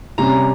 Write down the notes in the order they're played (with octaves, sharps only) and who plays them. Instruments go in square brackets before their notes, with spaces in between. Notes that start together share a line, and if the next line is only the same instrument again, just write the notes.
[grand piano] C3 G3 C#4 A#5